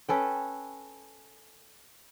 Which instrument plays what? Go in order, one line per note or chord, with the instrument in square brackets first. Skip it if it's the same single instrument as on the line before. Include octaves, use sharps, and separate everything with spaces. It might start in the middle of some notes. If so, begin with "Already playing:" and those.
[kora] C#4 A4 B4 G5